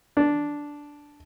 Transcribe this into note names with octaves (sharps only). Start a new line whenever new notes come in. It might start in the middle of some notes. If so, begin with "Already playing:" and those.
D4